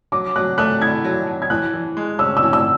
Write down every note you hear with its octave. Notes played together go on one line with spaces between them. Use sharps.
F#3 D6
F#3 F#6
A3 F#6
E4 G#6
F#3
F#3
G#6
E3 F#6
E3
G#3
C#4 E6
E6
E3
E6